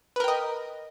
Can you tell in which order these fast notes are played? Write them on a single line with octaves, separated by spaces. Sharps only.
B4 A#4 G5 D#5